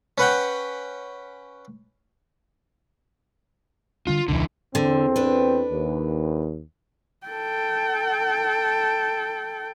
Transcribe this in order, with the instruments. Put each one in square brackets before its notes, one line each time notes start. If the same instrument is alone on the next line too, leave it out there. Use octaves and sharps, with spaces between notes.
[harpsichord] C#4 B4 F#5 G5
[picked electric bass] D3 G3 D4 [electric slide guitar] F4
[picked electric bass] E1 C#2 [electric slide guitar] D3 E3
[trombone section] E2 C4 [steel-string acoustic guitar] D3
[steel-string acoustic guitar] D4 B4
[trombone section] D#2
[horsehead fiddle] A4 G5